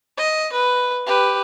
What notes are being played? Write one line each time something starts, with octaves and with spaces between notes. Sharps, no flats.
D#5
B4
G4 B4